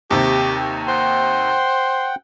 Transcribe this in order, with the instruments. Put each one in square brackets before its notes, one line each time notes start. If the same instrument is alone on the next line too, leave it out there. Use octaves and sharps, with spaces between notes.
[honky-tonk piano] D#2 C3 [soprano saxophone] G4
[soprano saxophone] C5 [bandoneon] F#5 G5